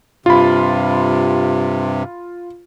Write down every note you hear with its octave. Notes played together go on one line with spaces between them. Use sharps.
G2 C3 F4 B5